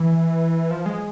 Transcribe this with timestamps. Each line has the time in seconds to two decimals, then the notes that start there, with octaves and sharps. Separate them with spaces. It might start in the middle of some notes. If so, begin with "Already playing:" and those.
Already playing: E3
0.71 F3
0.86 G#3